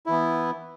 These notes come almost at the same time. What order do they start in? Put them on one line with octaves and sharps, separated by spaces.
E4 E3 B3